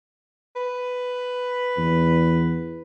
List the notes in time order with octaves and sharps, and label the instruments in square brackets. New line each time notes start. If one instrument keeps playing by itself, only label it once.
[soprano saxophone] B4
[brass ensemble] E2